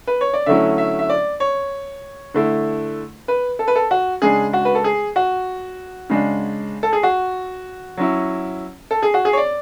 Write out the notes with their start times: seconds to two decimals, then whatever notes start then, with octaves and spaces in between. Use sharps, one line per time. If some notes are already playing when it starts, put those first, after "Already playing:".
0.07 B4
0.21 C#5
0.34 D5
0.46 D3 F#3 A3 C#4 E4 E5
0.78 E5
0.99 E5
1.09 D5
1.40 C#5
2.34 D3 A3 E4
3.28 B4
3.59 A4
3.68 B4
3.76 A4
3.91 F#4
4.22 C#3 G#3 D4 G#4
4.53 F#4
4.65 B4
4.75 A4
4.84 G#4
5.16 F#4
6.09 C#3 G#3 D4
6.83 A4
6.93 G#4
7.03 F#4
7.97 F#3 C#4 E4
8.91 A4
9.03 G#4
9.14 F#4
9.25 G#4
9.33 C#5
9.37 D5